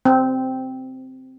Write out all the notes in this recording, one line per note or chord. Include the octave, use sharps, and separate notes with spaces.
C4